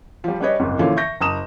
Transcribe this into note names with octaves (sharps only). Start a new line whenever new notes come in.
F3 G3
G3 D4 G#4 B4 C#5 D#5
F#1 C2 G#2
A#2 D3 E3 F3 C#4 F4
E5 C#6 G6 A#6
F#1 A5 A#5 D#6 E7